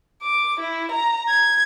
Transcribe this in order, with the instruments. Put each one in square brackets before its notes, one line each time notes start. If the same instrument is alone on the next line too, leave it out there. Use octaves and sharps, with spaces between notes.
[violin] D6
E4
A#5
G#6